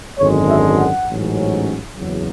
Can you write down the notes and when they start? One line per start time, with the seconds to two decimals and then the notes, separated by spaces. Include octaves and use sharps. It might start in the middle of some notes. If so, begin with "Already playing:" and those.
0.18 G#1 F#2 D3 G#3 C#5
0.48 E5
0.78 F#5
1.07 A1 G#2 F#3 C#4
1.96 F#1 E2 C#3 F#3